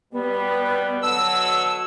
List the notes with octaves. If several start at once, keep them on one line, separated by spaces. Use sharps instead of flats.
B2 G3 B3
B2 D3 F#3 A5 E6